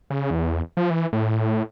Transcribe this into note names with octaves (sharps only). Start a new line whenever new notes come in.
C#3
E2
F3
E3
A2